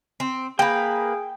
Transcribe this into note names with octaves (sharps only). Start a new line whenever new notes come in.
C4
A#3 G#4 B4 G5